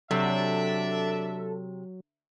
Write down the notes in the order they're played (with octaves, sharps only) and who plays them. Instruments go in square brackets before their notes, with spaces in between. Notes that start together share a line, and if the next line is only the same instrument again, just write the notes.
[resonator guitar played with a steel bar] C3 [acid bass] F#3 [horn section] D4 E5 [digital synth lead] A4